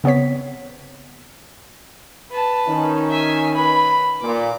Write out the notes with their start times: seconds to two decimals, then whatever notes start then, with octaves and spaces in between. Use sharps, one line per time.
0.04 C#3 B3 C4 C#5 B6
2.31 B4 A5
2.68 D#3 C#4 D#4
3.11 E5 G#5
3.54 B4 B5
4.22 A#2 D6